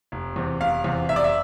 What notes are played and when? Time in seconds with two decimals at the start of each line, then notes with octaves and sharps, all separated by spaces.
0.12 F1
0.36 E2 C3
0.61 F1 F5
0.84 E2 C3
1.09 F1 E5
1.16 D5
1.24 E5